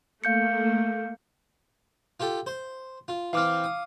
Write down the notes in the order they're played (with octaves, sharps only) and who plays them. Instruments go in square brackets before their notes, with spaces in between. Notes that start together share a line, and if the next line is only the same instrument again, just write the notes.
[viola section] A3 A#3 [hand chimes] F5 G6 C#7
[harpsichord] F4 G4 A4
C5
F4
[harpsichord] E3 C4 [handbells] F5 D6 F6
[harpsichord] D#6